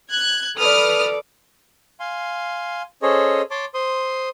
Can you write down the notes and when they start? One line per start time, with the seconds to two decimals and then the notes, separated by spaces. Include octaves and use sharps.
0.11 F#6 G#6
0.57 A4 B4 D5 D#6 F6
2.00 F5 G#5 C6
3.02 C#4 G#4 A4 C5 C#5 D#5
3.51 C#5 A5 C6 D6
3.74 C5 C6 D#6